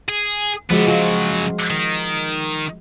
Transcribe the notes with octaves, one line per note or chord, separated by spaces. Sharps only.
G#4
D3 F3 G#3 B3 F#4
C#3 F#3 F4
D#3